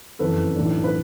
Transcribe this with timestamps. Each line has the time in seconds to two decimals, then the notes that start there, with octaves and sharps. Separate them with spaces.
0.19 F#1 F2 C#3 E3 A4 B4
0.56 B1 A2 E3 A3 D4
0.84 B4